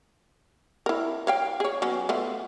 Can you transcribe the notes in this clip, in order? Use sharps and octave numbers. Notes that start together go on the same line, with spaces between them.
E4 A#4
C#5 F5 G5
G#4 C#5
F#3 B3 C#4
A3 B3 F4